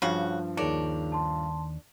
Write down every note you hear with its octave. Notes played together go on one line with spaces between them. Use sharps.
G2 C#3 F3 F#4
D#2 D4 D#4 G#4 A#4 C#5 F7
A5 C6